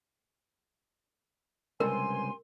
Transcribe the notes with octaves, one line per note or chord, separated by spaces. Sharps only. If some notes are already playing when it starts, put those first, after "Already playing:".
C#2 G2 C3 A#4 G#5 C6